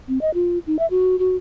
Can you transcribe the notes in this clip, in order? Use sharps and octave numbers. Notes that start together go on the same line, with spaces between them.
C4
D#5
F4
D#4
E5
F#4
F#4